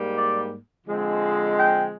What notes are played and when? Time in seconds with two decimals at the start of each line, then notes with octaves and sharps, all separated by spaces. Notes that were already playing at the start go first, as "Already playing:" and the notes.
Already playing: G#2 G3 A#3
0.14 D5
0.86 D3 F3 G#3 C4
1.57 G5